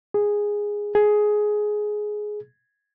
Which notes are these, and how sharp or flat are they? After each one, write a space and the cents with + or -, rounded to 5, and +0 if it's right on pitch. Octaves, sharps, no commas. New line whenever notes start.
G#4 -5
G#4 +15